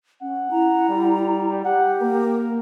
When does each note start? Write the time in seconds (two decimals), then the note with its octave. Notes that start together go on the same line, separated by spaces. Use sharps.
0.22 C#4 F#5
0.51 E4 A#5
0.89 G3
1.65 G4 F#5
2.01 A#3 A#4